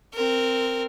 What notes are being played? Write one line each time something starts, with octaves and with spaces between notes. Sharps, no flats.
C4 A#4